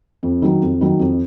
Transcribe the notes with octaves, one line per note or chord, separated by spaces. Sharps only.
F2
D#3 F#3
F2
D#3 F#3
F2